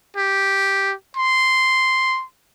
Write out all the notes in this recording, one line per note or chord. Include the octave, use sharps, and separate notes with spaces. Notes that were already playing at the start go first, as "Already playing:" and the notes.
G4
C6